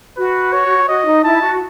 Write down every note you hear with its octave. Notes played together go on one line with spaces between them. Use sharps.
F#4 B4
C#5
F#4 D#5
D#4
E4 A5
F#4